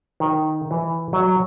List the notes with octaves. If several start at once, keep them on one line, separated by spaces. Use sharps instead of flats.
D#3
E3
F#3